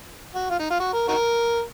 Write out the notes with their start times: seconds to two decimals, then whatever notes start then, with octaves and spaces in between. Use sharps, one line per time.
0.35 F#4
0.50 F4
0.59 D#4
0.70 F4
0.80 F#4
0.93 A#4
1.08 D#4 F#4 A#4